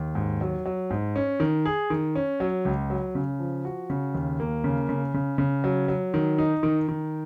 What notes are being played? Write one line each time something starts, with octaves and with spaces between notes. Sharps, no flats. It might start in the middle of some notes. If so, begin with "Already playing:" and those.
Already playing: D#2
G#2
F#3
F#3
G#2
C#4
D#3
G#4
D#3
C#4
F#3
C#2
F#3
C#3
F3
F#4
C#3
D#2
A#3
C#3
C#3
C#3
C#3
F#3
F#3
D#3
D#4
D#3
D#3